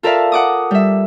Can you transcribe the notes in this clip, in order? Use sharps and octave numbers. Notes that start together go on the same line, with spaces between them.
F4 A4 A#4 D5 E5 F5
F#5 D6 D#6
G3 E5